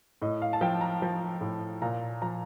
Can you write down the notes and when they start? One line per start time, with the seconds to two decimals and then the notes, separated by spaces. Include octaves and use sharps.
0.22 A2 D#5
0.42 F5
0.53 A5
0.61 F3 G5
0.81 A#5
1.02 F3
1.41 A2
1.82 A#2 A#5
2.22 F3 A#5